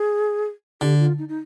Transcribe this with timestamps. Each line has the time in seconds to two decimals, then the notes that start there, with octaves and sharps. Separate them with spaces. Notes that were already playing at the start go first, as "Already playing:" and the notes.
Already playing: G#4
0.81 D3 G4
0.99 F4
1.18 D#4
1.29 D#4